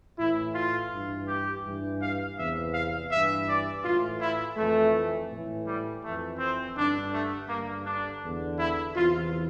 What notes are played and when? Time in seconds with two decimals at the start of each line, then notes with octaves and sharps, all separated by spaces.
0.19 A2 E3 E4
0.55 F4
0.91 G2 E3
1.28 G4
1.65 G2 E3
2.01 F5
2.37 E2 C3 E3 E5
2.74 F5
3.11 G2 E3 E5
3.47 D5
3.84 A2 E3 F4
4.21 E4
4.57 F2 E3 A3
5.30 A2 E3
5.66 G3
6.03 F2 E3 A3
6.39 C4
6.76 G2 D3 D4
7.12 A3
7.49 G2 D3 A#3
7.85 D4
8.22 E2 D3
8.58 E4
8.95 E2 C3 E3 F4